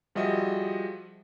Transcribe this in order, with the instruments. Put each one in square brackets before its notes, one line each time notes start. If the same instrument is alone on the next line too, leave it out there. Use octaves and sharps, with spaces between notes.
[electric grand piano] F3 G3 F#4 G#4 D#5 E5